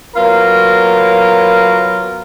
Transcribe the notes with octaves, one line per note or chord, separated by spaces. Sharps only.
F#3 B3 F4 A#4